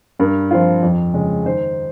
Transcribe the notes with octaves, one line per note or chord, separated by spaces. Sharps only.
G2 A#4
F3 C4 F4
F2
C#3 G#3
D#3 C5